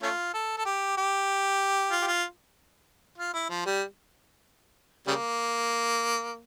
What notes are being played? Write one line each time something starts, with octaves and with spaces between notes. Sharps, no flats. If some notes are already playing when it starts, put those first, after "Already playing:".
A3 C#4 F4
A4
A4
G4
G4
F4
G4
F4
F4
E4
F3
G3
C#3 G3 A#3